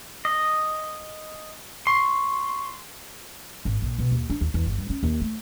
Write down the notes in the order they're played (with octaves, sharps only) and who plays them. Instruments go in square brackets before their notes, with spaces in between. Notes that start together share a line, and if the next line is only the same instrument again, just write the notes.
[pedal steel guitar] D#5
[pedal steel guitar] C6 [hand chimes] C#6
[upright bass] G#1
A#1
B2
D#2
D4
D#2
E2
G1
G2
C#4
D#2
A3